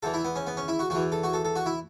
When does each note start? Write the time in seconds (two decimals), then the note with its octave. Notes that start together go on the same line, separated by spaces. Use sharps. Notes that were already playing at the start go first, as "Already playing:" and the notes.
0.03 E2 E3 A4
0.14 E4
0.25 B3
0.36 C#4
0.47 B3
0.57 C#4
0.68 E4
0.79 F#4
0.90 E2 E3 F#4
1.12 A4
1.24 F#4
1.34 A4
1.45 A4
1.56 F#4
1.66 E4